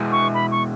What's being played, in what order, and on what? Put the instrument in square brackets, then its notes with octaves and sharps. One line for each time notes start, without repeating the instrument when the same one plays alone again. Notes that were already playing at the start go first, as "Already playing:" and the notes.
Already playing: [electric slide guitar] B2 G#3 B3 E4 G#4
[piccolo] C#6
B5
C#6